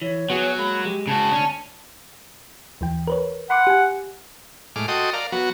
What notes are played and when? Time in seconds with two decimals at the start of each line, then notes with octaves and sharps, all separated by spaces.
0.02 E3 C#5
0.30 F#3 B3 F#4 G#4
0.58 G#3 A#3 B5
0.85 G#3 G4
1.07 C#3 F#4 A5
1.32 D2 C#4 D4
2.81 D#2 E3 G5
3.07 A#4 B4 C#5
3.50 F#5 B5 C6 D6
3.67 G4 G#5
4.76 A2 G#3 D6 F6
4.88 F#4 A4 D#5 G5 C6 D#6
5.13 A#4 D5 F5
5.32 F#3 B3 F#4